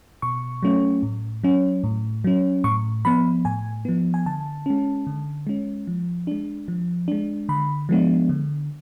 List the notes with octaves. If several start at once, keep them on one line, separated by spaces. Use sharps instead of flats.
B2 C#6
F#3 A3 C#4
A2
F#3 C#4
A2
F#3 C#4
A2 C#6
F3 B3 B5
A2 G#5
F3 B3
G#5
D3 A5
G#3 C#4
D3
G#3 C#4
F3
G#3 D4
F3
G#3 D4
D3 B5
F3 G#3 B3 D4
D3